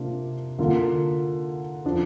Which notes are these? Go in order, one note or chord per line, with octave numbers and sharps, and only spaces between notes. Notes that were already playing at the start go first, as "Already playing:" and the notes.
Already playing: C3 A#3 D4 F4
D3 A#3 F4
F3 D4